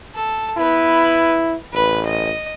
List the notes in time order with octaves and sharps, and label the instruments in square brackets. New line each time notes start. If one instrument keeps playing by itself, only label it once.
[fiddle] A4
[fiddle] B3 B4 [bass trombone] E4
[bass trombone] A1 [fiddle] B4
[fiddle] D#5